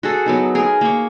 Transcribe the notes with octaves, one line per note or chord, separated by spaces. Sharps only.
F#4 G#4 A4
F#3 B3 D#4
G#4 A#4
A#3 C#6